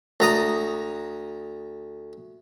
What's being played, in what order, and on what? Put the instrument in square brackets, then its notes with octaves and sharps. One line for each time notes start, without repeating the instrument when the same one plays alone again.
[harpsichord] D2 A#5 D#6